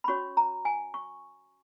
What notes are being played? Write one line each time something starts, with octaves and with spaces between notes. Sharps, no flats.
B5
C#4 F#4 C#5 C#6
A#5
G#5
C#6